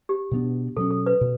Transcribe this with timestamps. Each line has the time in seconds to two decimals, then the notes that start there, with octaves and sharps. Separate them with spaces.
0.09 G4
0.31 B2 G3 B3 D4
0.76 B2 F#3 C#4 A4
0.91 A4
1.06 B4
1.21 B2